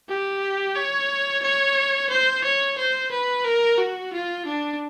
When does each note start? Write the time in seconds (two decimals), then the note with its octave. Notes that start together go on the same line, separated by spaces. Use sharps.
0.09 G4
0.76 C#5
1.42 C#5
2.10 C5
2.44 C#5
2.78 C5
3.11 B4
3.44 A#4
3.78 F#4
4.13 F4
4.45 D4